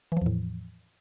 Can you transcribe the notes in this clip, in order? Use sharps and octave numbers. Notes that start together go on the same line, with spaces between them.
E2 A2 E3 F3